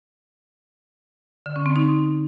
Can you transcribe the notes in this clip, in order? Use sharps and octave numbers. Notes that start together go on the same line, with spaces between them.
D3
C#4
C4
D#4